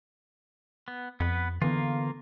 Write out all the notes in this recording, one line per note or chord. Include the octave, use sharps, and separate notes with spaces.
B3
F2 B3 B4
D3 E3 A#3 B3 F4